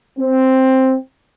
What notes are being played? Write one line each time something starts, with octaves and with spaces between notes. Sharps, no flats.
C4